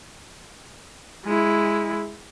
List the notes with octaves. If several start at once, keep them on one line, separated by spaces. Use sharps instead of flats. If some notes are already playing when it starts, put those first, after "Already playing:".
G#3 E4